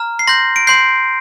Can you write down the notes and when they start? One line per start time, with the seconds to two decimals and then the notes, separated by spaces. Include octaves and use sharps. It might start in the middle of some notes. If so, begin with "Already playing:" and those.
Already playing: A#5 F6
0.19 C7
0.27 C6 G6 A#6
0.56 D7
0.67 C6 G6 C7